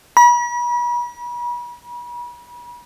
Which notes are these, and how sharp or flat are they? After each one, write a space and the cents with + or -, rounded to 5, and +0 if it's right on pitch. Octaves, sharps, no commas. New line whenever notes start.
B5 -40